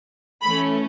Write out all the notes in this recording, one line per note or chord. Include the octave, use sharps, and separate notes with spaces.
E3 A3 C#4 B5